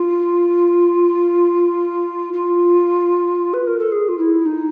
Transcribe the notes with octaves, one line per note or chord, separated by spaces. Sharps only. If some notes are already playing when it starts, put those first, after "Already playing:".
Already playing: F4
F4
B4
A#4
A4
G#4
F4
E4
D#4